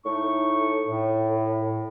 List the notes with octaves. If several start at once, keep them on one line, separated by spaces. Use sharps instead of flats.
A2 A3 D#4 C#6
A2